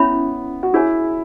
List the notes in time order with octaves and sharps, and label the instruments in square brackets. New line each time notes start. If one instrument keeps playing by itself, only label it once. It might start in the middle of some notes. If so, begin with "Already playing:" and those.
Already playing: [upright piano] B3 [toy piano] C#4 E4 C#5 E5 B5
[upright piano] F#4
[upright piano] E4 [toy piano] G#4 C#5 G#5